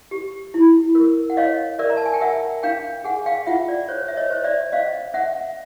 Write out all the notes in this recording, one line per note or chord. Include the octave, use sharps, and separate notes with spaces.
G4
E4
A#4
F#5
C#5 D#5 F5
A#4 D5 E5
A#5
A5
G#5
G5
A#4 E5 F#5
D4 F5 G5
G#4 F#5 G#5
F5 G5
F4 E5 F#5
D5
C5 C#5
E5
C#5 D#5
C5
D5 E5
C#4 D#5 F5
C#4 E5 F#5